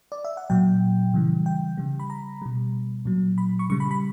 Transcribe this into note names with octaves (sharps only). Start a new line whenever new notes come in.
D5
E5
F#5
A#2 F#3 G5
C#3 E3 G3
G5
C#3 G3
B5
A#5
B2 G3
A#2 F#3
B5
C#6
C#3 G3 C#6
B5
B5